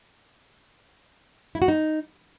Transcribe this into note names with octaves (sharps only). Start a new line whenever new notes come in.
E4
F#4
D#4